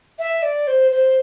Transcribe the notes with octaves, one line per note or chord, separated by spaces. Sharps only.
E5
D5
C5
C5